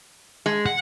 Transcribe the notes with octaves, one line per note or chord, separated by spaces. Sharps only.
G#3
F#5